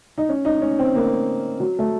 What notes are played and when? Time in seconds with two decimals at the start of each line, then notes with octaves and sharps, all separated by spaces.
0.18 D#4
0.29 C#4
0.45 D#4
0.62 C#4
0.79 C4
0.95 A#3
1.60 F#3
1.79 A3